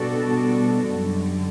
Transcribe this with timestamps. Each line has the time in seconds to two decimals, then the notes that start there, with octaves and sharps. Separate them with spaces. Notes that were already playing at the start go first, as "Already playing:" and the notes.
Already playing: B2 G3 D4 F#4 A4
0.84 F#2 D3 G3